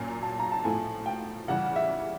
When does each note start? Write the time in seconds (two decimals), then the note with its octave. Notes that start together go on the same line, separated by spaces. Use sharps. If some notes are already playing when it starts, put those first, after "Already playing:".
Already playing: A#2 F#3 A#3 C#4 G#5
0.23 A5
0.39 A#5
0.52 A5
0.64 A2 F3 A3 G#5
1.06 G5
1.48 C#3 E3 G3 F#5
1.76 E5